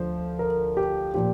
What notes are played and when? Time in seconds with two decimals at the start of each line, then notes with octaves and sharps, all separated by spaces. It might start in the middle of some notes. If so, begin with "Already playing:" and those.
Already playing: D2 D3 F3 C5
0.39 A#4
0.77 G4
1.14 A#2 F3 G4